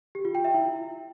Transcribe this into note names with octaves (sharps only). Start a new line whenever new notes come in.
G4
F4
G5
E5
E4